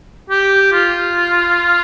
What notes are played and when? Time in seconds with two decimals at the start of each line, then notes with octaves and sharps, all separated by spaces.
0.30 G4
0.72 F4